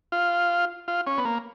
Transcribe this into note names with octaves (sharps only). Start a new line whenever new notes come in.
F4
F4
C#4
B3
A#3